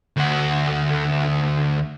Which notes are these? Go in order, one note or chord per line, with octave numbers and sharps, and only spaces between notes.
D2 F#4